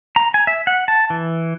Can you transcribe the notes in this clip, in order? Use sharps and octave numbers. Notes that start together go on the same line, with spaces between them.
A#5
G#5
E5
F#5
A5
E3